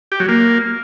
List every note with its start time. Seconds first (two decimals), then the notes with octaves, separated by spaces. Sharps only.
0.12 G4
0.20 F#3
0.28 A#3